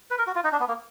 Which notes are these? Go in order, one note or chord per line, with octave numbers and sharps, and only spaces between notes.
B4
A#4
F#4
F4
D#4
D4
B3
A#3